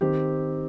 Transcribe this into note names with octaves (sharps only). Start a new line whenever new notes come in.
D#3 C4 G4